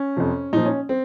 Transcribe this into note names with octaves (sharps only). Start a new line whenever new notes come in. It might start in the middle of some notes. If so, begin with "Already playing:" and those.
Already playing: C#4
F2 C3 F3
A#2 F3 D#4
C#4
C4